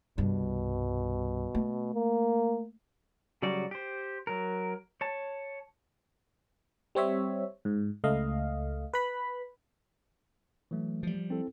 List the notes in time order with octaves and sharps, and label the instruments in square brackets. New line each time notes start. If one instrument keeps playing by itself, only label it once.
[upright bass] C2 G2 [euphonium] B2
[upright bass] A3
[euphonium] A#3
[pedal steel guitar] C#3 F#3 G3 F#4 D5
G4 C5
F#3 A#4
C#5 A5
[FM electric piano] G3 C4 C#5 E5
G#2
C#2 A3 D#5 F5
B4 B5
[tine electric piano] E3 F#3 A3
[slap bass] F3 G3
[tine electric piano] C4 E4 A4